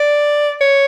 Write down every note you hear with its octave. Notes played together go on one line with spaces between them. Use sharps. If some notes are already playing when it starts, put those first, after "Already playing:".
Already playing: D5
C#5